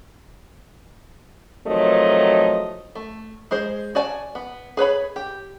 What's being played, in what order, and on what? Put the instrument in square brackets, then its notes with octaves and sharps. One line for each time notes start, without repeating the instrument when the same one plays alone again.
[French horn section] C3 D#3 F3 F#3 A3 D#5
[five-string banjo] A3
G#3 G#4 C5
F#4 D5 G#5 A5
B3
G#4 B4 C#5 B5
G4